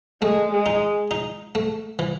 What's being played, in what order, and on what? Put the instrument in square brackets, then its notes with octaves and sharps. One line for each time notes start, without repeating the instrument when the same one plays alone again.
[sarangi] G#3 [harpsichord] A3
[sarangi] G#3
[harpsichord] D#4
D#4
A3
E3